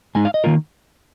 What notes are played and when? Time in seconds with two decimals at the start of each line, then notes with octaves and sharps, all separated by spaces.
0.15 G#2 G#3 D#4 G#5
0.25 F5
0.34 D#5
0.44 D#3 A#3 F4 A#4